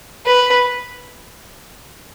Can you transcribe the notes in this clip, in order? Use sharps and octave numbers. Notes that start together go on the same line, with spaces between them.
B4